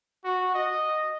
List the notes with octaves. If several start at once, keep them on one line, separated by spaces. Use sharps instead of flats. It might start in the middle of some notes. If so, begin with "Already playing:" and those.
F#4
D#5